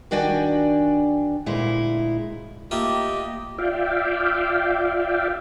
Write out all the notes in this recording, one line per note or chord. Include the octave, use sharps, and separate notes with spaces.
D#3 D4 F#4 D5 G5 G#5
D2 A#2 G#3 E4
A3 A#3 F4 G4 D#5
F4 D5 E5 F5 G5